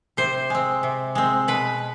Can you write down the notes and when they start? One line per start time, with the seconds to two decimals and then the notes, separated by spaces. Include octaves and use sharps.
0.17 C3 C5
0.50 G#3 C4
0.83 C3
1.15 G#3 C4
1.48 B2 B4